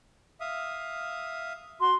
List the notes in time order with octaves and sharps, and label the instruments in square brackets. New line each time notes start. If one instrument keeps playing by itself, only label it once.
[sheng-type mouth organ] E5 F5 D#6
[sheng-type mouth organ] F#4 [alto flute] C6